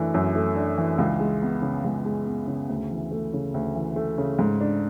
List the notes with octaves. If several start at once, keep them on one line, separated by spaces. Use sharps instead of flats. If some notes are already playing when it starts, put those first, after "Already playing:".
Already playing: F#2 E3 A3 D4
F#2
A3
D4
E3
C#2
G#3
B3
C#3
C#2
G#3
B3
C#3
D2
E3
A3
C#3
D2
E3
A3
C#3
G#2
D4